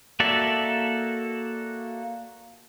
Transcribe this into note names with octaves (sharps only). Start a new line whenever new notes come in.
A#3 F#4 A4 D5 E5